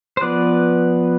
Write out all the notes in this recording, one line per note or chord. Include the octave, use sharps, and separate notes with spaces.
C5
F3 B3 B4 D5